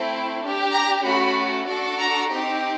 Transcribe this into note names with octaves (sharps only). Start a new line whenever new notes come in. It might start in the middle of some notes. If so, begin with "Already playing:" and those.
Already playing: A3 C4 E4
D4 G4
A#5
A3 C#4 F#4 B5
D4 F#4 A4
A#5
C4 D#4 G4